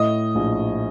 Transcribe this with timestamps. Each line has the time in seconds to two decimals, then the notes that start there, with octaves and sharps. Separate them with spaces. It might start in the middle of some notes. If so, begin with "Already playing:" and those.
Already playing: A2 D#5
0.35 A#1